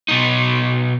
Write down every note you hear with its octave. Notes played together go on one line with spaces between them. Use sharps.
B2 D#4